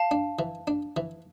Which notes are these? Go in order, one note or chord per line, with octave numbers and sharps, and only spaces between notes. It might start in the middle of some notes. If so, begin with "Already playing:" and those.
Already playing: F5 A5
D4
E3
D4
E3